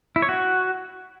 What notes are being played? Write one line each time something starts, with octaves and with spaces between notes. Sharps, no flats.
E4
C#5
F#4